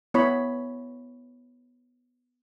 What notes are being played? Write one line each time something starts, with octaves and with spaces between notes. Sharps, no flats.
B3 E4 C#5 B5